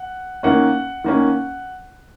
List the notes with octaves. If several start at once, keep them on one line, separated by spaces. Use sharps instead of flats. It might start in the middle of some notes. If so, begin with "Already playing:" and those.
Already playing: F#5
D#3 A#3 C#4 F#5
D#3 A#3 C#4